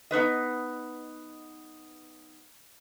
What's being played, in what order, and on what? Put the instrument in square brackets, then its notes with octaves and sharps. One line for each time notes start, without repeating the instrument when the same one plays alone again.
[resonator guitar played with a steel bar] B3 D#4 B4 D#5